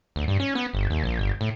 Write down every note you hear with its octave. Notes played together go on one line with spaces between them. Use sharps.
D2
G2
C#4
B3
G1
D#2
A#1
G1
A2